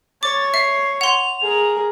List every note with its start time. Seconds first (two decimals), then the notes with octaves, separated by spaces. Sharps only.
0.23 C#5 D6 A6
0.54 E5 C7
1.01 F#5 C6 F7
1.42 G#4 A#4